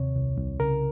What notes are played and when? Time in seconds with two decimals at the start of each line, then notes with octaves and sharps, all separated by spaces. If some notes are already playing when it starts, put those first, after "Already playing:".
Already playing: D#2 C3 C#5
0.16 C2
0.38 C2
0.60 C#3 A#4